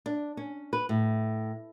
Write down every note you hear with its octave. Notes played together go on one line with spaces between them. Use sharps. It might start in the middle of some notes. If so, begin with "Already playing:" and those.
D4
C#4
B4
A2